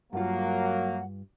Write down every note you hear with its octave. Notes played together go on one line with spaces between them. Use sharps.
G2 F#3 A#3 F4 F#5